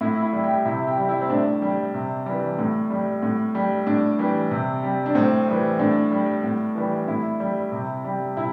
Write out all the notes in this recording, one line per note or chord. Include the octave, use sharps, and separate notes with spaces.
A2 E4
E4
G3
G4
C3 E4
G4
G3
E4
C4
A2 D4
G3
C3
E3 G3
A2
G3
A2
G3
A2 D4
E3 G3
C3
G3
D4
A2 C4
E3 G3
A2 D4
G3
A2
E3 G3
A2 E4
G3
C3
G3
C3 E4